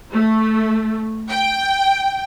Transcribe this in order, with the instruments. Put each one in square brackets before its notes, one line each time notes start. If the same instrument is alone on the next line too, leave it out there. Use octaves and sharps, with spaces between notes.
[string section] A3
G5